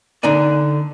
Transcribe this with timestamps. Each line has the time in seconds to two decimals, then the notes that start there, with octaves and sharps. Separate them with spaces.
0.23 D3 D4 D#4 D5 G#5